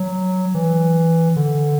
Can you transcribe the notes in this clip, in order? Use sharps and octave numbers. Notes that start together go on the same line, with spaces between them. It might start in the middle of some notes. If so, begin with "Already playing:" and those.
Already playing: F#3
E3
D3